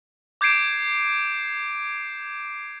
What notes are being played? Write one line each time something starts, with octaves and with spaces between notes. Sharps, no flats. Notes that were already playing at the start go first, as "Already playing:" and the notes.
D6 G6 G#6 C7 D7 E7